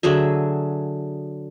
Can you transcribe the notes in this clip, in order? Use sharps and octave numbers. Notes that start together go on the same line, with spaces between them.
D3 F#3 G#4 E5